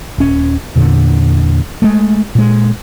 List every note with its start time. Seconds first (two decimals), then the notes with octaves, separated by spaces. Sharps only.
0.18 D#1 C#4
0.76 E2 A#2 D3
1.82 G#3 A3
2.35 A#2 G#3